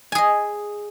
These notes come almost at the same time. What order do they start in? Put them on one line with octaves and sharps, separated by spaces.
G#5 G#4 D#5